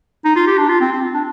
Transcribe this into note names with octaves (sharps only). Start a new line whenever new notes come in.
D#4
F4
G4
D4
F4
C4
C4
D4